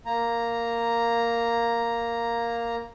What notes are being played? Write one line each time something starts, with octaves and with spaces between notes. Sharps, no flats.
A#3 A#5